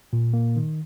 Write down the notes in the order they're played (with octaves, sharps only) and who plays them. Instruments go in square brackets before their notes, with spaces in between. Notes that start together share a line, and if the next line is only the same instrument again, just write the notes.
[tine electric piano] A#2
A#3
D#3